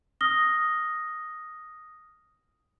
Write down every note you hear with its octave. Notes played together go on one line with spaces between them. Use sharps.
D#6 F6 A#6 G7